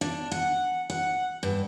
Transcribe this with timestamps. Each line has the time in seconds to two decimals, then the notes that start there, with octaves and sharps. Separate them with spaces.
0.01 D4
0.32 F#5
0.90 F#5
1.43 G2